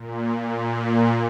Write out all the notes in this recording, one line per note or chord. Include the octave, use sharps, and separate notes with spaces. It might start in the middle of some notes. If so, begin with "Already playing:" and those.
Already playing: A#2
A#2